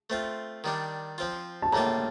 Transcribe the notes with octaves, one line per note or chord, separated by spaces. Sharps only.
A3 C4 F4
D#3 G3 D4
F3 C4 F4
A5
A2 G3 A#3 F4 A#5